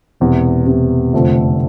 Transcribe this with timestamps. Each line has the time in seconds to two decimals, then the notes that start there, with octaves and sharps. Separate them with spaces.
0.20 E1 E2 C3
0.66 E1 E2 C3
1.13 F1 F2 D3 A3 C4